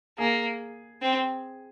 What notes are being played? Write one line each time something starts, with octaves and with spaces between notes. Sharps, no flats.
A#3 G#4
C4